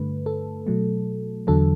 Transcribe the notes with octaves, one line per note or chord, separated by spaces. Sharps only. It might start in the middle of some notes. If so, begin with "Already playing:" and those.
Already playing: G2 D3 A3 B4
A4
B2 F#3 A3
E2 D3 F#3 A4